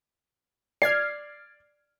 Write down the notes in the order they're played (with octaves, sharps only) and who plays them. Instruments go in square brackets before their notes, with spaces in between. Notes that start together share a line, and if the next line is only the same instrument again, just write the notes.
[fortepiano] D5 [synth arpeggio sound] F6 G#6 C7